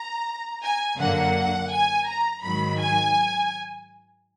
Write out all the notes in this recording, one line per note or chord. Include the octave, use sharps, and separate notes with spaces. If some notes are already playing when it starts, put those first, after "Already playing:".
Already playing: A#5
G#5
F#2 D3 F#3 A#3 F#5
G#5
A#5
G#2 D#3 F#3 B5
G#5